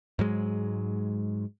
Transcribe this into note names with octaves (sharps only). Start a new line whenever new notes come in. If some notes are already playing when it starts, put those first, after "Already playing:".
G#2 F#3 G#3